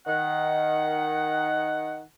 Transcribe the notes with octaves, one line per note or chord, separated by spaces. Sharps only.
D#3 F#5